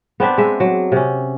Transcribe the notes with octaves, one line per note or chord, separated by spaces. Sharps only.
B3 C4 D4 B4
G#3 E5
F#3
C3 C#4